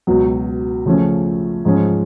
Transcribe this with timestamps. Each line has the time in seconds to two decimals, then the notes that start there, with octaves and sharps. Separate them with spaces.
0.07 C#2 B2 F#3
0.86 C#3 F3 A3 C#4
1.65 G#2 F3 G#3 C#4